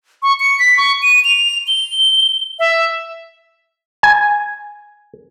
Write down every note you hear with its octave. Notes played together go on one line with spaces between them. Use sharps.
C#6
C#7
B6
C#6
D#7
F7
G7
E5
G#5